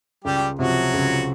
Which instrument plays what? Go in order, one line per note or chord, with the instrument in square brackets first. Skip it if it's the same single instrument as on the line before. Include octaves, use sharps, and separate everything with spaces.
[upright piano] C#2 [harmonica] G3 G4
[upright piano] C3 F3 [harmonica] F#3 F#4
[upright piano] C#2